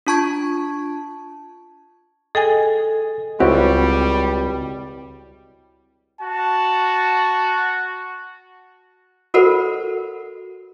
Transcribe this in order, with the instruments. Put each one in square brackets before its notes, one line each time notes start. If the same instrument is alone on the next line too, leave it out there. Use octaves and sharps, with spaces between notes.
[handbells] D4 F4 A5 C#6 G#6
[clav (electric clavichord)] G#4 [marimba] A4 G5 G#5 [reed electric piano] D#5
[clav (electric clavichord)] C#2 G4 [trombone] G3 [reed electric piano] C4 E4 F#4 [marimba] C#6
[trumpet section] F#4 [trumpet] A5
[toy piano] F#4 A4 A#4 C5 F#5 B5